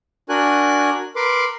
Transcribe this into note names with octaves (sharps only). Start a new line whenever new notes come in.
D4 F#4 A#4 G#5 F#6
A#4 B4 C6 D6